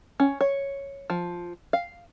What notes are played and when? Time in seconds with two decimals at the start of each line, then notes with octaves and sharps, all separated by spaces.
0.20 C#4
0.41 C#5
1.10 F3
1.73 F5